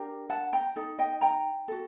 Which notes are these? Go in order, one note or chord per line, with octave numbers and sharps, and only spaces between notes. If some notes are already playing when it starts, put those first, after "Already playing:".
Already playing: D4 G4 A#4
F#5 A5
G5 A#5
D#4 A4
D#5 G5
G5 A#5
F#4 A4